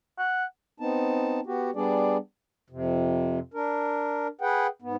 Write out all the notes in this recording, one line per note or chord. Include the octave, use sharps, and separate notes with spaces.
F#5
B3 C4 D#4 A5
B3 F#4 G4
G3 B3 D4 G#4 D5
F2 C3
D4 A#4
G#4 B4 F#5 G5
G#2 B3